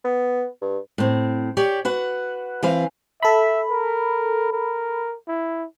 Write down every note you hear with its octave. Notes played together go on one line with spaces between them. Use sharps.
B3
G2
A2 C4
G4 C#5 D5
F#4 B4 F#5
E3 C4 B4 F5
A4 E5 B5
A#4
A#4
E4